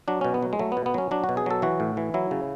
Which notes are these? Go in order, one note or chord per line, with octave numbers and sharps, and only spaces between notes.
F#3 D4
B2 C#4
B3
F#3
G#3
F#3 A3
B3
B2
B3
F#3 C#4
F#3 D4
F#4
B2
G#4
F#3 A4
E3 F#4
A2
E3
F#3 E4
C#3